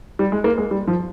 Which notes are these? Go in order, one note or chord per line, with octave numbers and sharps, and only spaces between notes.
G3
G#3
A#3
G#3
G3
F3